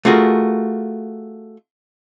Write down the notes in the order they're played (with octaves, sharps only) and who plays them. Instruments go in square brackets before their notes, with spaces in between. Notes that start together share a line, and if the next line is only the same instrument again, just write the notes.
[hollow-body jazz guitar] A3 F4 F#4 G#4 A#4